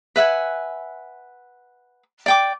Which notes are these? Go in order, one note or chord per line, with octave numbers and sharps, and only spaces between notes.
B4 E5 F#5 G#5
D5 G5 D6